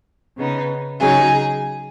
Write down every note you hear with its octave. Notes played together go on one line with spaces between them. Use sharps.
C#3 B3 D#4
C#3 F#3 D#4 G#4